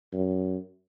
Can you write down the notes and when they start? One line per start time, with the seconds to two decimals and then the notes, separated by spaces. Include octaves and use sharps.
0.13 F#2